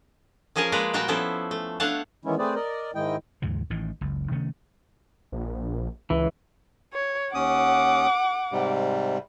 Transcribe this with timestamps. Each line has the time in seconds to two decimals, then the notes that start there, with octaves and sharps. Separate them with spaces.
0.56 F3 C#4 G#4 A#4 G#5 A5
0.72 G#3 A#3 B4 C5 D5 A#5
0.93 A#2 G3 F#4 A#4 G5 A5
1.08 F3 B3 C#4 E4 A4 C5
1.51 A3
1.80 A3 D4 C#5 F5 F#5 A5
2.25 D#3 E3 G#3 B3 C#4 E4
2.39 A3 C4 G#4 B4 C5 D5
2.55 A#4 D5 D#5
2.95 G#2 D#3 G#3 E4 D#5 G5
3.42 D#2 G#2 C#3 F3
3.70 A1 A2 D#3 E3
4.01 F#1 C#2
4.31 C3 D#3 A3 C#4
5.32 A#1
6.10 C#2 E3
6.93 C#5
7.34 D#2 C#4 F#5 D6 D#6
8.52 G#2 C3 G3